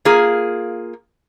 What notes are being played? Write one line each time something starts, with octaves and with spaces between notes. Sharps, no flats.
A#3 F4 G#4